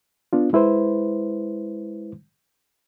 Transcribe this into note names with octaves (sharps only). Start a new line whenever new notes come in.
B3 D4 F4
G#3 E4 B4 C5